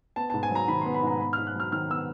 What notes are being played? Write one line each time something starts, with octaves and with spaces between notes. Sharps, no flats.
B3 A5
G#2 A5
G#5
F#3 A#5
D#3 B5
C6
B3
B5
G#2 A#5
B3 B5
F6
G#2
F#6
F#3 F6
D#3 F6
B3 E6